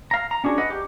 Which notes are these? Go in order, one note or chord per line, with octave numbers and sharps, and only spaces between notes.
F5 A#5
A#5
C#4 D4 F#4 G#4
B4 D#5 F#5
G4